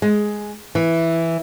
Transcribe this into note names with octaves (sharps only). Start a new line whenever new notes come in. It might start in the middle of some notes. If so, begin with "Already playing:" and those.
G#3
E3